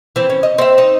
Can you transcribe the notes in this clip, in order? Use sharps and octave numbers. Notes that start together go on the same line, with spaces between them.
E3 C4
C#4
D#5
C4 E5
D#4